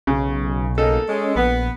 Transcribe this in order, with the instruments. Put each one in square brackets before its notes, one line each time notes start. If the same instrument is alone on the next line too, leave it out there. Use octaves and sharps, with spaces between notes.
[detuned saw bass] B1 [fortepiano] C#3
[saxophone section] C#3 A#3 D#4 [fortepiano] A4
[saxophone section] G#3 [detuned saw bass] C#4
[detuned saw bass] A#1 [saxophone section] B3